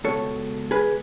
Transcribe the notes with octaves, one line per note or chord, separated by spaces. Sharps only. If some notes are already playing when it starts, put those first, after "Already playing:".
C#2 B2 A4 C#5
G#4 B4